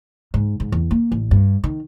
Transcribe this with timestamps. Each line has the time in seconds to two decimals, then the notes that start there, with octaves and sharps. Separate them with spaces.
0.34 G#2
0.60 G#2
0.72 E2
0.91 A#3
1.12 A1
1.31 G2
1.64 D#3